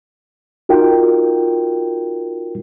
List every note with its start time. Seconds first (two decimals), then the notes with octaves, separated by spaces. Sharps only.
0.69 D#4 F4 F#4 A#4 G5